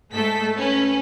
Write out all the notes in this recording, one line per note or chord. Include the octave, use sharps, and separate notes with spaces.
G#2 A3 A4 B6
C#4 B4